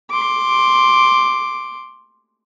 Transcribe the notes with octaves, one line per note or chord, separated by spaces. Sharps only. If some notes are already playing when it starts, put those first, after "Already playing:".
C6 D6